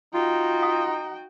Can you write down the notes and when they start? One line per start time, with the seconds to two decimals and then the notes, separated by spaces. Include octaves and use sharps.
0.14 D#4 F4 F#4 G5
0.62 F5 B5 D#6